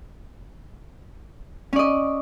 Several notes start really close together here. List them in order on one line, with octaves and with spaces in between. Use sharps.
C#4 D5 D#5